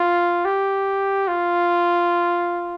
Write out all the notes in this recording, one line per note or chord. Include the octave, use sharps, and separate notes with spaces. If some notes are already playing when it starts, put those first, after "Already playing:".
Already playing: F4
G4
F4